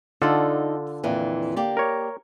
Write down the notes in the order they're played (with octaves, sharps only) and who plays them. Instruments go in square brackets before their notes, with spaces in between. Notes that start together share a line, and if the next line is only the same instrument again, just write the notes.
[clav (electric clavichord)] D3 F4 A4 [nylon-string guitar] D#4 D5 F#5
[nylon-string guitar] F2 A#2 E3
A#3 G4 D5
[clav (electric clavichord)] A#4 C#5